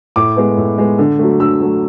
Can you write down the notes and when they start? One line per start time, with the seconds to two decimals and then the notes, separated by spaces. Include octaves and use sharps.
0.16 A2 D6
0.37 G#3 B3
0.57 A2
0.78 G#3 B3
0.99 D3
1.19 F#3 A3
1.40 D3 E6
1.61 F#3 A3